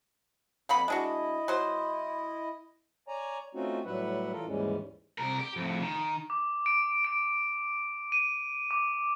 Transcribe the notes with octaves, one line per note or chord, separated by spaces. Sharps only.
F2 A#3 B3 B5
G#3 D4 E4 F#4 D#5
F#3 C5
C#5 D5 G#5 A#5
A3 C4 C#4 D#4 F4 F#4
A2 F#3 G3 B4 E5 F#5
E3 F4 A4 A#4
D#2 G#2 E3 G3 G#3 C#4
C2 A#4
G4
F2 A2
D#3
D6
D7
D7
D#7
D6